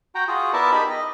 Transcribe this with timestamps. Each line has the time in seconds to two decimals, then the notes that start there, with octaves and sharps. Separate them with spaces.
0.15 F#4 G5 A#5
0.28 F4 F#4 G#4
0.53 B3 E4 A#4 D5 E5 A5
0.72 D#4 G4 G#4 B5 E6
0.90 D#5